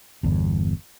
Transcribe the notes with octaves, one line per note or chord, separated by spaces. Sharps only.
G1 E2